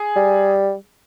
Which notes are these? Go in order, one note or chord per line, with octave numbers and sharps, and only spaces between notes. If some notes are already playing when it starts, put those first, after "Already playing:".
Already playing: G#4
G3